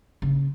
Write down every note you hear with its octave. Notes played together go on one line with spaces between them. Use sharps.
C#3